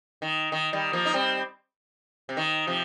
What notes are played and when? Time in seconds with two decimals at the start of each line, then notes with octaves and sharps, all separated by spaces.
0.22 D#3
0.52 D#3
0.73 D#3 G3
0.93 F3 A#3
1.05 D#4
1.14 G3 C4
2.29 C3
2.37 D#3
2.67 C3 F3